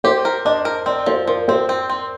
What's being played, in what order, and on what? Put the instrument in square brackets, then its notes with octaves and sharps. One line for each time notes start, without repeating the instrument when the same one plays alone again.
[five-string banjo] G4 [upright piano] C5
[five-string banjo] A#4
[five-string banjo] D4 [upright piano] D#5
[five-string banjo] A#4
[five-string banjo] C4 [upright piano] D5
[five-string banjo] F3 [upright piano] C5
[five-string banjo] F3 [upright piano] A#4
[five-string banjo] C4 [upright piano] C5
[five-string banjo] C4
C4